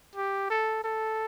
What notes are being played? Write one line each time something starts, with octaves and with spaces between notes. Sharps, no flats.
G4
A4
A4